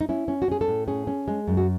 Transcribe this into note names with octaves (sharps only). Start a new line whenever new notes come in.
D#4
C#4 E4
C#4
F#4
C#4 G#4
A4
A2
C#4 G#4
C#4
G#3
F#2
F#4